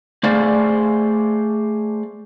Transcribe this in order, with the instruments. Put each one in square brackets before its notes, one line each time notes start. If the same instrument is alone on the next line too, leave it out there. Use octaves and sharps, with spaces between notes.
[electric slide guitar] A3 G#4 C5 D5 F5